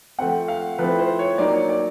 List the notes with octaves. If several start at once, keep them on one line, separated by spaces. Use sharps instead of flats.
F3 A3 C4 F#5
F5
F3 A3 C4 E4 B4
C5
C#5
F#3 A#3 D#4 D5
C#5
D5